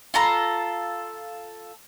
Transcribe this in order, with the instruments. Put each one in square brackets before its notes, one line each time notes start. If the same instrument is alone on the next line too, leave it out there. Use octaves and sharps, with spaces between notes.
[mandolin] F4 A4 A#5